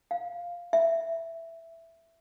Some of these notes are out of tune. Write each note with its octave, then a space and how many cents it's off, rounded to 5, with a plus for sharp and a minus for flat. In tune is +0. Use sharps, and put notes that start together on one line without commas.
F5 +0
E5 +5